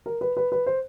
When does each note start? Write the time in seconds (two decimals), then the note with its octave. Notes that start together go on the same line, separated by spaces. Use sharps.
0.06 A#4
0.21 B4
0.37 B4
0.52 B4
0.67 C5